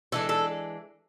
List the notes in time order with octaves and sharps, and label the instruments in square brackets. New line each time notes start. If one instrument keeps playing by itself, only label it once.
[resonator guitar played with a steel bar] E3 G#3 D4 [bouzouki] A4
[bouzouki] A4